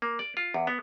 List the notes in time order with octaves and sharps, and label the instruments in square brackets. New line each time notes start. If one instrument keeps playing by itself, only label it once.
[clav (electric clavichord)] A#3
D5
F4
E2
B3